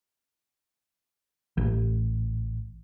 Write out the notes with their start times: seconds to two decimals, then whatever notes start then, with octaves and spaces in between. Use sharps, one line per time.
1.57 A1